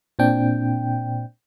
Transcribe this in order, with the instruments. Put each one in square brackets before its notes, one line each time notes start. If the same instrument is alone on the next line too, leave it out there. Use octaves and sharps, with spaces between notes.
[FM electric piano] A#2 C4 D4 G5